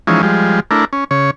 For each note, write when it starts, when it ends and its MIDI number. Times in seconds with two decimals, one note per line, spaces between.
0.07 0.22 52
0.07 0.22 53
0.07 0.22 56
0.07 0.22 61
0.07 0.22 63
0.23 0.60 53
0.23 0.60 55
0.23 0.60 56
0.71 0.85 57
0.71 0.85 62
0.71 0.85 64
0.71 0.85 70
0.93 1.04 61
1.11 1.31 49
1.11 1.31 73